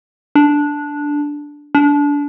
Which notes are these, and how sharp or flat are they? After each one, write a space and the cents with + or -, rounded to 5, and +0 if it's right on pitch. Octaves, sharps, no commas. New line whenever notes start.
D4 -5
D4 -25